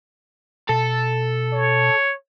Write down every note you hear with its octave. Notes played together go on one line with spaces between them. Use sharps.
B2 A4
C#5